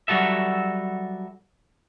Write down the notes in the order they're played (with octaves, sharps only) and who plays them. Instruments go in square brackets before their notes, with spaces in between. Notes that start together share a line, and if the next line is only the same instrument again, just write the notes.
[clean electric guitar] F#3 G3 F#4 A4 E5